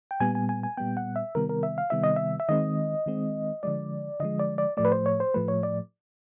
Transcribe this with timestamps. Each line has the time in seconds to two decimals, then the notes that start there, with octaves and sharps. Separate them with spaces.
0.11 G5
0.20 A#2 G3 B3 G#5
0.35 G#5
0.49 G#5
0.63 G#5
0.77 A#2 G3 B3 G5
0.97 F#5
1.16 E5
1.35 C3 D#3 G3 B3 A#4
1.49 A#4
1.63 E5
1.78 F5
1.90 C3 D#3 G3 B3 E5
2.03 D#5
2.16 E5
2.40 E5
2.49 D#3 G#3 C4 D#5
3.06 D#3 G#3 C4
3.63 D3 F3 G#3 D5
4.20 D3 F3 G#3 D#5
4.39 D5
4.58 D5
4.77 A2 F3 A3 D5
4.85 B4
4.92 C5
5.06 C#5
5.20 C5
5.34 A2 F3 A3 B4
5.48 C#5
5.63 D5